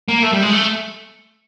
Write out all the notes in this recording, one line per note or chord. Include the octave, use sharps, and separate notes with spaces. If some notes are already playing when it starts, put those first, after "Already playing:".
A#3
A3
G3
G#3
A3